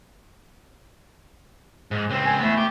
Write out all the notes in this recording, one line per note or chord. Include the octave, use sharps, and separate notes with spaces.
G#2
C#2 C4
G#5
A3 B3 E4
G4